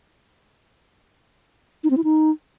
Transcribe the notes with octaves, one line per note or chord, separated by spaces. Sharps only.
D#4
C4
E4
D#4